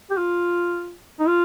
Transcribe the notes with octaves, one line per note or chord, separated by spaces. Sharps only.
G4
F4
D#4
F4